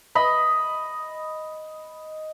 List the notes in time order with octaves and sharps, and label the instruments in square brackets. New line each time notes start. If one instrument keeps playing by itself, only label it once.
[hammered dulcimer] D#5 B5